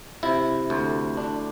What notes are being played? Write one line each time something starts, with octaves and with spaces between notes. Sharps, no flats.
C3 E4
D2
D4